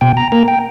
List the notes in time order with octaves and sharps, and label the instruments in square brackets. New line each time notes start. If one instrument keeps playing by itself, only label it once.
[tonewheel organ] B2 G5
A#5
A#3 A#5
G5